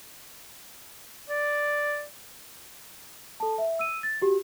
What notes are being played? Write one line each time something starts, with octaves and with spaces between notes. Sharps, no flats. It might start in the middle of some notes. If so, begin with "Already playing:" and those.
D5
A4 A5
E5
E6 D#7
A6
F#4 G4